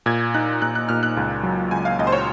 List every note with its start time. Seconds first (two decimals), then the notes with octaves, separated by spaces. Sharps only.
0.06 A#2 G#6
0.34 D#4 F#6
0.62 A#2 F#6
0.75 F#6
0.89 A#2 F6
1.03 F#6
1.17 C#2
1.43 F#3
1.71 C#2 G#5
1.85 F5
1.99 C#2 D#5
2.07 C5
2.12 C#5